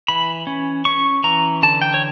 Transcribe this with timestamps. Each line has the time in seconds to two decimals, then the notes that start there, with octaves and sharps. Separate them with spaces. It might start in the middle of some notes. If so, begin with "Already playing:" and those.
0.08 E3 B5
0.47 C#4
0.85 C#4 C#6
1.24 E3 A#5
1.63 D3 A5
1.82 G5
1.94 C#5